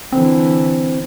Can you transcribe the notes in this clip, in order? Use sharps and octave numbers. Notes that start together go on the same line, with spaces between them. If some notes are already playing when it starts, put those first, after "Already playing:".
D3 E3 C4